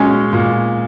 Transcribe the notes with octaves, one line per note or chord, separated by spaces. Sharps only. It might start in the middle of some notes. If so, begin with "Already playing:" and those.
Already playing: A#2 G#3 C#4 G#5
A#2